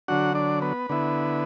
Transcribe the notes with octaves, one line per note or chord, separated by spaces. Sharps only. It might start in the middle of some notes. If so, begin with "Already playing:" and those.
D3 F#3 D4 F#4 F#5
D4 D5
B3 B4
D3 B3 E4